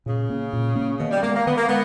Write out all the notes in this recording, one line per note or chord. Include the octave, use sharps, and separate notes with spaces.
A#2 C#3
A#3 C#4
A#2
A#3 C#4
B2 D#3
G3
G#3 A#3 B3
A#3
D#3 B3
A#3
G#3 B3